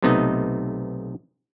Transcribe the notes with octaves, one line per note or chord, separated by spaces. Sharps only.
B1 C3 A3 B3 D#4 D#5